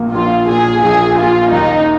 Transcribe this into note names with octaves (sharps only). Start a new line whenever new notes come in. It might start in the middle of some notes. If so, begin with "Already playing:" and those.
Already playing: A#1 A#2 A#3
A#1 F4
A#2 G#4
A#1 G#4
A#3 F4
D#2 D#4